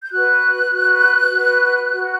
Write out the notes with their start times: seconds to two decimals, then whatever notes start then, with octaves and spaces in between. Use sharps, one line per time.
0.03 G6
0.11 F#4 B4 F#6
0.72 F#4 B4
1.31 F#4 B4
1.92 F#4 B4